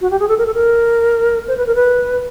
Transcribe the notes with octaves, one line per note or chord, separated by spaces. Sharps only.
F#4
G4
G#4
A4
A#4
A4
A#4
C5
B4
A#4
B4